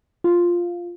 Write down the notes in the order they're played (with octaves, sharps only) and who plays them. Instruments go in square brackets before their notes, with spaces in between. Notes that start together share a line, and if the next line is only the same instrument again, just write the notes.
[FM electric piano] F4